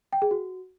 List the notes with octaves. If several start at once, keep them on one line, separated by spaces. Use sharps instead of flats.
G5
G#4
F#4